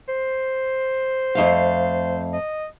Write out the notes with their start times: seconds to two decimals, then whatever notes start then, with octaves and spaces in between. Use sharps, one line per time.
0.09 C5
1.35 F2 A3 F5
2.33 D#5